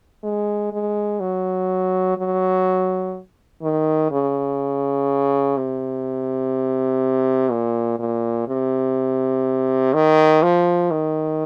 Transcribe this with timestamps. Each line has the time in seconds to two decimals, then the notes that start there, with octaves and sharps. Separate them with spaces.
0.24 G#3
0.73 G#3
1.20 F#3
2.18 F#3
3.63 D#3
4.11 C#3
5.57 C3
7.51 A#2
8.00 A#2
8.48 C3
9.94 D#3
10.42 F3
10.91 D#3